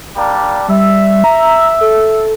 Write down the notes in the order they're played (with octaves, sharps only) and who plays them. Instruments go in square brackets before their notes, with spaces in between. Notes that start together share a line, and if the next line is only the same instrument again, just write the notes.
[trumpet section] G3 A#3 D4
[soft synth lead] G3 [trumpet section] E5
[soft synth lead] A#5
A4